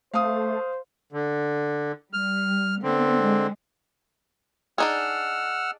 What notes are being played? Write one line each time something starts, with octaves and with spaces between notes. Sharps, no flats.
A3 C5 F5 D#6
D3
G3 F6
D3 B3 C4
G#3
D4 D#4 G#4 F#5 E6 F6